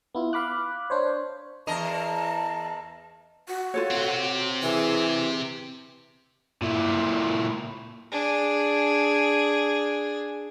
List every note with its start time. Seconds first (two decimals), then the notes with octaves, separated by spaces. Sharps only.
0.14 B3 E4 F4
0.33 F5 B5 D6 F#6
0.90 D4 C5 C#5
1.67 E2 A#4 D#5 A5
3.48 F#4
3.74 F4 A4 C#5
3.91 C3 C4
4.63 E3 G#4
5.20 G4
6.62 A#2 E4
8.11 D4 G#4